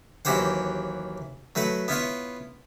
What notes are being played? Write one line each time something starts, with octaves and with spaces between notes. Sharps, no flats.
D#2 E3 F#3 G4 C5 F#5
F#3 A3 B4 F#5
B3 E4 F4 C#5